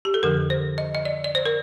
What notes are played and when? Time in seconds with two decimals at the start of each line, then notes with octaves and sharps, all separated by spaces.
0.05 G4
0.14 A4
0.23 F2 D3 F3 A#4
0.50 C5
0.78 D#5
0.95 D#5
1.05 D5
1.24 D5
1.35 C5
1.46 A#4